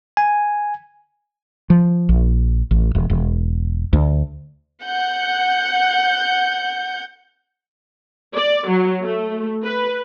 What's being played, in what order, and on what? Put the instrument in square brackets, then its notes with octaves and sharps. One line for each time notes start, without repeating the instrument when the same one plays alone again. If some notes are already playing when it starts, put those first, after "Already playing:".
[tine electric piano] G#5
[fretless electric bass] F3
A#1
A1
E1
E1
D2
[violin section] F#5 G6
[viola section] D5
F#3
A3
B4